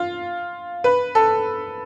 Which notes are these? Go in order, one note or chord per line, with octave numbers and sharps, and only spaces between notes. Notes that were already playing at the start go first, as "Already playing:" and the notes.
Already playing: F4
B4
A4